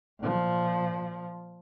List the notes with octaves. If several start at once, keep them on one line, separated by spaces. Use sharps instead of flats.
A#2 F3